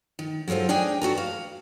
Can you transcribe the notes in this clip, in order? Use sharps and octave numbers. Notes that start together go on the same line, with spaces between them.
D#3
F#3 G#3 F4 A4 C5
D4 D#4 G#4 G5 G#5
B3 F#4 A4 A#4
F5